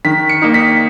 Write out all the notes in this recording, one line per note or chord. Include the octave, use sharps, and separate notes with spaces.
D#3 B6
C#7
A#3 D#4
B6